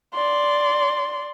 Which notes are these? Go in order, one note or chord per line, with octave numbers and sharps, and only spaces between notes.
D5 C6